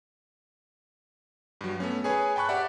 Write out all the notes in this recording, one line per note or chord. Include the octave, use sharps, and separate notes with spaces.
G2 F#3
A3 B3 C#4
G#4 B4 C#5 G#5
G5 A5 B5 C#6 F#6
G4 D5 E5 F#5